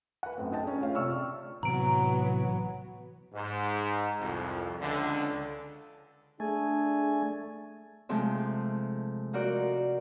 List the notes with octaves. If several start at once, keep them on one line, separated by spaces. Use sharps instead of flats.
B4 F#5
F#2 A3 C4
D#4 D#5 G5 A5
C#4 G#4
A3 F4 C#5 F5 G5
C3 F4 D5 C#6 E6 F6
A2 C3 E3 F#3 B3 A#5 D7
G#2
C2 F2
C#2 D3
A3 D4 G#4 G#5
C3 F3 G#3 A3 C4
D#4 F4 F#4 A#4 D5